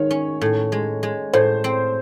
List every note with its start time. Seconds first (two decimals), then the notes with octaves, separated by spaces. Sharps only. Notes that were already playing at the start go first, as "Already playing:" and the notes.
Already playing: D#3 G#3 C#5
0.11 C#4
0.41 A2
0.72 G#3
1.03 G#3
1.33 A2 C5
1.64 C4